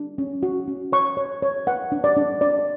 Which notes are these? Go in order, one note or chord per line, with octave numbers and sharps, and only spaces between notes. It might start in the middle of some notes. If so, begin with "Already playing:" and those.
Already playing: D4
C#4
F#4
C#4
C#5 C#6
C#5
C#5
B4 F#5
D4
D5
D4
D4 D5